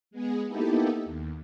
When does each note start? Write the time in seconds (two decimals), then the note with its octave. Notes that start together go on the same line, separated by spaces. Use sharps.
0.11 G#3 B3 G#4
0.46 A#3 B3 D#4 E4 G4 A4
1.05 D#2